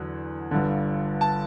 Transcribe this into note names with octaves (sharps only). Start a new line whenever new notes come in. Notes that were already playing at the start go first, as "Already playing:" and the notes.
Already playing: E2 D3 F#3
G1 G2 D3
A5